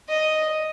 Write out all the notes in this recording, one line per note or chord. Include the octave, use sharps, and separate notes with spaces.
D#5